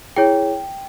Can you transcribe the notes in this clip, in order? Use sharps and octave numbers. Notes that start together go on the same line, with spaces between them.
E4 G#4 C#5 G5